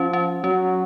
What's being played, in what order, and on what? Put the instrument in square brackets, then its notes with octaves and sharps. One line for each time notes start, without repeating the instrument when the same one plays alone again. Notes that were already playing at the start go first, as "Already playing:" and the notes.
Already playing: [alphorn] F3 [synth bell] C#4
[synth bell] C#4
[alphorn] F#3 [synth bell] C#4